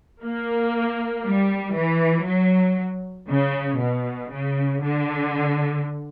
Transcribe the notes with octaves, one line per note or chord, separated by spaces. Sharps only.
A#3
G3
E3
F#3
C#3
B2
C#3
D3